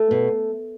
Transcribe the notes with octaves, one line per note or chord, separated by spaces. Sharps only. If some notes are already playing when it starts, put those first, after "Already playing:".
Already playing: A3
B2